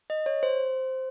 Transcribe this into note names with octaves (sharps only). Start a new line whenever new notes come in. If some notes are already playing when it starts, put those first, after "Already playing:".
D#5
C#5
C5